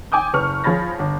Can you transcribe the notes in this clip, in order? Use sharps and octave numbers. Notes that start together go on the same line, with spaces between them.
G5 G#5 D6 D#6 G6
F#1 B4 C#6 F6
F3 G#4 C#5 B5 A6 A#6
G1